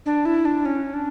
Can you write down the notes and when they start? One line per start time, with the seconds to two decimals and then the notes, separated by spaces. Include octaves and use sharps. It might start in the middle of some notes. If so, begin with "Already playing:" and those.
0.06 D4
0.25 E4
0.45 D4
0.65 C#4
0.94 D4